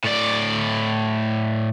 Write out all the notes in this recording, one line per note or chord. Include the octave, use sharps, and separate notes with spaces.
A2 D5